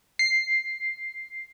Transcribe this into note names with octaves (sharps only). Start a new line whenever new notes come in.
C7